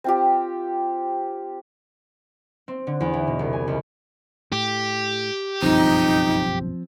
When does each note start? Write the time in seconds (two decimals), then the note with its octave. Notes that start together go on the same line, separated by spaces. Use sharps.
0.04 C4 F4 G4
2.68 C4
2.87 D3
3.01 E2
3.14 E3
3.27 B2
3.39 C2
3.53 G#5
3.68 C#2
4.52 A2 G4
5.62 F#1 B1 G2 F3 C4 D#4